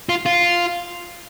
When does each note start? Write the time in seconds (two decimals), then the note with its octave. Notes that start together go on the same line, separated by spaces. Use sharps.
0.09 F4
0.26 F4